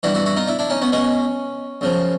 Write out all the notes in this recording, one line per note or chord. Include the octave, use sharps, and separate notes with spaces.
G2 E3 G3 E4 F#4
E4 F#4
E4 F#4
D#4 F4
D4 E4
D4 E4
C#4 D#4
B3 C#4
B2 G#3 B3 C#4
F#2 C#3 F3